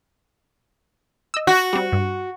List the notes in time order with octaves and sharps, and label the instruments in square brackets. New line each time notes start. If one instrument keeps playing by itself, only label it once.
[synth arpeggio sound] D#5 E6
[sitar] F#4
[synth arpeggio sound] G3 C4
G2